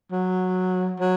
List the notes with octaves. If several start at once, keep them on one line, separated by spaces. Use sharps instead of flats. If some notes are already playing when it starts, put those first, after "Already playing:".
F#3
F#3